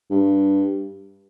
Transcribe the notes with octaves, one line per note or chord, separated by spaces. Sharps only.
G2